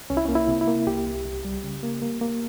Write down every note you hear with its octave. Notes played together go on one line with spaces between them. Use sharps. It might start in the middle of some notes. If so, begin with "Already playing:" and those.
C2 C#4
E4
A#3 C#4
E4
C3
E4
A#3
C2 G4
C2
C2
G3
C#3
A#3
A#3
A#3